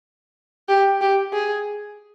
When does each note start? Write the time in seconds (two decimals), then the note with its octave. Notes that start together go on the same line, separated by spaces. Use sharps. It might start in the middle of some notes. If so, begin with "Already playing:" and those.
0.69 G4
1.01 G4
1.33 G#4